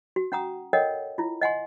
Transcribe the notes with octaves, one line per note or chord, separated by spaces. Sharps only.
F#4
C#4 F#5 A#5 D#6
A4 A#4 C#5 D#5 F#5 G5
E4 F4
D#5 F#5 G#5 C6